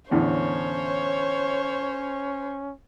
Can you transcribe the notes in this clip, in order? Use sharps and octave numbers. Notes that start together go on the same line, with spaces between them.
E2 A2 D3 C#4 C5 C#5